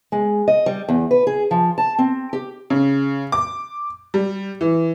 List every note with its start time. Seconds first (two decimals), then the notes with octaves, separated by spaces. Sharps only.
0.12 G#3
0.48 D#5
0.66 G3
0.89 E2
1.11 B4
1.27 G#4
1.51 F3
1.78 A5
1.99 C4
2.33 G4
2.70 C#3
3.32 D6
4.14 G3
4.61 E3